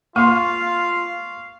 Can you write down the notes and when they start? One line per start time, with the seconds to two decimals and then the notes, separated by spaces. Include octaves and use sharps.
0.16 A#3 F4 F5 C6 C#6